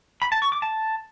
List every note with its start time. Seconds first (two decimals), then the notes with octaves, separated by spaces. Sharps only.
0.22 B5
0.32 A5
0.42 C#6
0.52 D6
0.62 A5